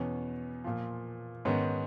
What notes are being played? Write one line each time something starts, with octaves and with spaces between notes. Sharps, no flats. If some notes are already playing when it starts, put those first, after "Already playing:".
Already playing: E2 B2 B3 C#4
A#2 F3
G#2 D#3 B3 C#4